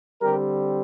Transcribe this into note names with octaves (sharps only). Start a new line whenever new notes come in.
D3 G3 C4 G4 A#4